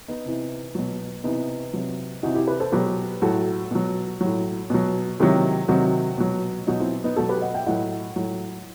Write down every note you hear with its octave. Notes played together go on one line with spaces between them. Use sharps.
B3 D#4
C3 E3
B2 F#3
C3 E3 B3 D#4
C3 F#3
C3 E3 D#4 F#4
E4 G4
G4 B4
A4 C5
B2 F#3 G4 B4
A2 F#3 F#4 A4
B2 F#3
A2 F#3
B2 F#3
C3 D#3 F#3 E4 G4
C3 D#3 F#3 D#4 F#4
B2 F#3
B2 F#3 D#4 F#4
C4 E4
B3 D#4
B2 F#3 F#4 A4
G4 B4
D#5 F#5
E5 G5
A2 F#3 D#5 F#5
A2 F#3